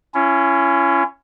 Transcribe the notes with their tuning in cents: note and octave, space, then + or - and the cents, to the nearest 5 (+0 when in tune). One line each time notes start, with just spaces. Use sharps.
C#4 +0 E4 +45